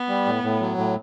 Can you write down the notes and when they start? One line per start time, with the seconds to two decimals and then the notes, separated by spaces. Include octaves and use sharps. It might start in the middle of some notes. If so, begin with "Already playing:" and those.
Already playing: B3
0.09 G3
0.26 A2
0.43 A2
0.60 F#3
0.78 A2